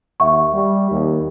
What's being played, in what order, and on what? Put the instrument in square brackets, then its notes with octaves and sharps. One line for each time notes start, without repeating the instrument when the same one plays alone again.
[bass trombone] D#2 [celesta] E5 F#5 C#6
[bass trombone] G3
D#2